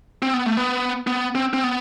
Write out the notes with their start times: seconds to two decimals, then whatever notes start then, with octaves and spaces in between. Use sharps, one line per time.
0.22 C4
0.34 B3
0.46 A3
0.57 B3
1.07 B3
1.35 C4
1.53 C4
1.64 B3